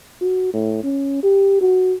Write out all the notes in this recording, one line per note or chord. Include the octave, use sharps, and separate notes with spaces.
F#4
A2
C#4
G4
F#4